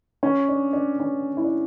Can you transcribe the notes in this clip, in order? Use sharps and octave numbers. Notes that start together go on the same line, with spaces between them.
C#4
D4
D4
C#4
E4
D4